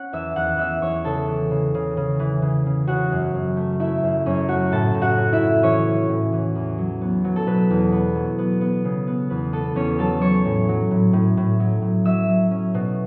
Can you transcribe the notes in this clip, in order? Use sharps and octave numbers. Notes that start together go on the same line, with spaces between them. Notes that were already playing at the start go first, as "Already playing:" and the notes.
Already playing: C#4 F#5 F#6
E2 E5 E6
E2 F#5 F#6
E2 E5 E6
E2 C#5 C#6
C#3 A4 A5
E3
C#3
C#3
C#3
E3
C#3
C#3
C#3 F#4 F#5
F#2
F#2
A3
A3 E4 E5
F#2
F#2 C#4 C#5
A3 F#4 F#5
A2 A4 A5
A2
F#4 F#5
C#4
E4 E5
A2
E3 C#4 C#5
E3
A2
E3
E2
F#3
B3
F#3
A4
B2 B4
E2
B3
F#3
B3
B3
C#3
B3
E2 B4
B3 A4
E2 C#4 C#5
F#3 A4 A5
F#3 C#5 C#6
A2
F#3
A2
A2
A2
F#3
A2
F#3 E5 E6
F#3
C#4
B2